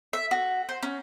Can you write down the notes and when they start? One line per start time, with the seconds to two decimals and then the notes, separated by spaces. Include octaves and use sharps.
0.13 E5
0.31 F#4
0.69 C5
0.83 C#4